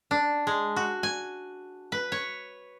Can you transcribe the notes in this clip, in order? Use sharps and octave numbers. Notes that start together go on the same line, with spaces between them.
D4
G#3
F#4
G#5
B4
C#5